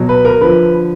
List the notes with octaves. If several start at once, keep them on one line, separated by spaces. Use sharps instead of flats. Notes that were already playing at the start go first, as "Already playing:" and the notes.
Already playing: B2 F#3
B4
A#4
D3 F3 B4